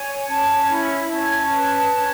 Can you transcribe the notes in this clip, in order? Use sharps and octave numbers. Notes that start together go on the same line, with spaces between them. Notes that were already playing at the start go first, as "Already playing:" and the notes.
Already playing: C#5 G#5
C#4 A5
E4 B5
C#4 A5
B4
C#4